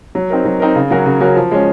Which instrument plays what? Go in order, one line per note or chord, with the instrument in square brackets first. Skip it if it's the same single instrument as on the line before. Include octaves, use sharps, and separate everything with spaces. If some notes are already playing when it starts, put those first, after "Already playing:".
[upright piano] F#3
C4 D#4 A#4
F#3
C4 D#4 A#4
C#3
F#3 C#4 F#4 A#4
C#3
F#3 C#4 F#4 A#4
F3
G#3 C#4